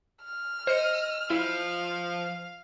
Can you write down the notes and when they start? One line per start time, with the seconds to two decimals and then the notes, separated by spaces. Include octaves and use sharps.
0.25 F6
0.67 C5 D#5 C#7
1.30 F3 E4 F5